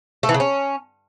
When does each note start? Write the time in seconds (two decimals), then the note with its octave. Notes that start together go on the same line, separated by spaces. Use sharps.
0.23 A3
0.29 E3
0.34 C#3
0.40 C#4